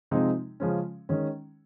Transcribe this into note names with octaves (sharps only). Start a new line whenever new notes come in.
C3 F3 G#3 C4 D#4
C#3 F3 G#3 C#4
D#3 G#3 C#4